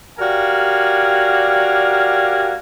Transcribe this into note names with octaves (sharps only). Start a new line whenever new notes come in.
F#4 G4 A#4 D5 F5 G#5